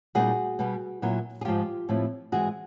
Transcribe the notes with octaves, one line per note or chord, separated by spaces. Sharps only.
A#2 G3 B3 D#4 F#4 G#4
B2 G3 B3
A#2 F#3 B3 E4
G#4
G#2 F3 G#3 F4 G4
A2 F3 A3 C4 E4
G#2 E3 G#3 F#4 G#4